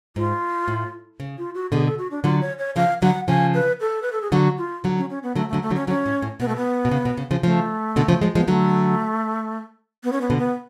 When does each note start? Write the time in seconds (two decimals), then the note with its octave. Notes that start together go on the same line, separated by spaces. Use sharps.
0.16 G#2 F4
0.68 A2
1.20 C#3
1.38 F4
1.55 F#4
1.72 B2 D3 G#4
1.86 A4
1.98 F#4
2.11 D4
2.24 D3 F#3 F4
2.41 C#5
2.59 C#5
2.76 C#3 F3 F5
3.02 D3 F#3 F#5
3.28 C#3 F3 G#5
3.54 B4
3.81 A4
4.02 B4
4.12 A4
4.22 G#4
4.32 D3 F#3 F#4
4.58 F4
4.84 D3 F#3
4.98 C#4
5.10 C#4
5.23 B3
5.35 D3 F#3 A3
5.49 D3 F#3 A3
5.62 A3
5.71 D3 F#3
5.76 C#4
5.87 D3 F#3 C#4
6.06 A2
6.22 A2
6.40 B2 B3
6.48 A3
6.56 B3
6.85 B2
6.91 C#3
7.05 B2
7.17 C#3
7.31 C#3 F3
7.43 C#3 F3 A3
7.96 B2 D3
8.08 C#3 F3
8.21 F3 G#3
8.35 F3 G#3 B3
8.48 D3 F#3 A3
10.04 B3
10.12 C#4
10.21 B3
10.30 B2 D3
10.38 B3